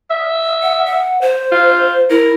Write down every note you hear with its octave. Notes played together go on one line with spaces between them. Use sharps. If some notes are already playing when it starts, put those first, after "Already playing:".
E5
F#5
F#5
C5
F4
E4 A#4